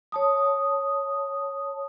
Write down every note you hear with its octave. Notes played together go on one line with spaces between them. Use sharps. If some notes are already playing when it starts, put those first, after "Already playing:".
C#5 A5 D#6